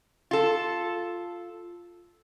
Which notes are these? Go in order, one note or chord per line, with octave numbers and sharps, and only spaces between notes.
F4 A4